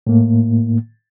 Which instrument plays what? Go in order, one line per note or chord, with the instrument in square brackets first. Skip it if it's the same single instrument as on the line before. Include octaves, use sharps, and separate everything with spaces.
[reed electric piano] A2 A#3